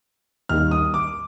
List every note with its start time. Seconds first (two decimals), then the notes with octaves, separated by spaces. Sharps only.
0.49 D#2 D#3 G3 F6
0.71 D#6
0.94 D6